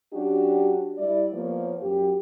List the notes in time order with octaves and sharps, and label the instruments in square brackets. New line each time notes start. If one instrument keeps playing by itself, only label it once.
[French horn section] F#3 C#4 D4 F#4 G4
G3 E4 D5
F3 A#3 B3 C#5
F#2 G4